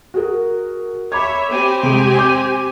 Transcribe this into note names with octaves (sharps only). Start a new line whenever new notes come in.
F#4 G#4 A#4
C#5 E5 B5 D6 G#6
C4 G4 G#5
C3 G#3 D7
D6 G6